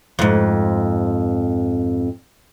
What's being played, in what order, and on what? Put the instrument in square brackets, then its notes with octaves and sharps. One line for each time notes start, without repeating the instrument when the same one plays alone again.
[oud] F2 G#2